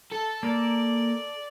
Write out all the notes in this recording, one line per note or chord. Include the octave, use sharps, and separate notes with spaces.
A4
A#3 A#4 D5